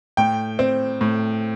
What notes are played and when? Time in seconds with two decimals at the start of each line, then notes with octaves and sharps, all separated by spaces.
0.17 A2 G5
0.59 C4
1.01 A2